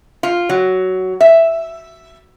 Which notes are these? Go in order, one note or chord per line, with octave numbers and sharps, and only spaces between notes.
F4
F#3
E5